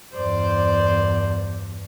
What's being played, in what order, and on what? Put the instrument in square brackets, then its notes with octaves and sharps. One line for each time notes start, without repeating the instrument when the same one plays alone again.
[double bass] E2 G2 [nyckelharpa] C5 D5